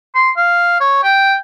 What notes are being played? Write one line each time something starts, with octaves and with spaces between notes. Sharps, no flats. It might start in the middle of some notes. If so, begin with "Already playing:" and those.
C6
F5
C#5
G5